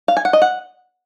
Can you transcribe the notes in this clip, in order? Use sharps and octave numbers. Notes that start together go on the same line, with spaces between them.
F5
G#5
F#5
D#5
F#5